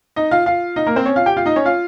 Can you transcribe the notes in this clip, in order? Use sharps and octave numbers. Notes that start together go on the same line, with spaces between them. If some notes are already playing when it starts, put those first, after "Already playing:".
D#4 D#5
F4 F5
F4 F5
D#4 D#5
A#3 A#4
C4 C5
C#4 C#5
F4 F5
G4 G5
F4 F5
D#4 D#5
C#4 C#5
F4 F5